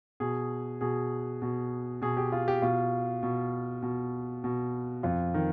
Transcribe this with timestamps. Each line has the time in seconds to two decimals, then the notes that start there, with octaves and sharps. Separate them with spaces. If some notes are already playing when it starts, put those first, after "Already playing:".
0.20 B2 G#4
0.81 B2 G#4
1.42 B2
2.02 B2 G#4
2.17 G4
2.32 F4
2.48 G4
2.62 B2 F4
3.23 B2
3.82 B2
4.44 B2
5.03 F2 F4
5.34 D#3